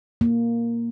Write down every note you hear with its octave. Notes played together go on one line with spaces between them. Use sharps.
A#3